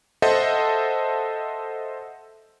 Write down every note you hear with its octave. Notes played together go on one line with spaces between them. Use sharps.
A4 C5 D#5 E5 F#5 A5